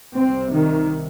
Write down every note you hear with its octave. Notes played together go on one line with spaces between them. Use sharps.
C2 C3 C4
D#3